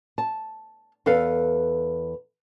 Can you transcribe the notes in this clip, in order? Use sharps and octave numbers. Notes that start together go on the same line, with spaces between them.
A5
E2 A4 B4 F5